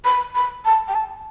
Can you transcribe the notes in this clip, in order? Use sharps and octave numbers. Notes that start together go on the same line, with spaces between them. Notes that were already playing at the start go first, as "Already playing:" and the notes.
B5
B5
A5
G5
A5